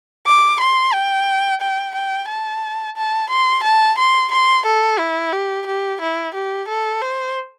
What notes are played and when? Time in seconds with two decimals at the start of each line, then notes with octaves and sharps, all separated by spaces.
0.26 D6
0.60 C6
0.94 G5
1.61 G5
1.94 G5
2.29 A5
2.96 A5
3.30 C6
3.63 A5
3.98 C6
4.31 C6
4.65 A4
4.99 E4
5.32 G4
5.66 G4
6.00 E4
6.34 G4
6.68 A4
7.01 C5